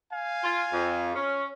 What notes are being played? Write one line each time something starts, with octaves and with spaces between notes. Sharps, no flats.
F5 G#5
F4
F2
C#4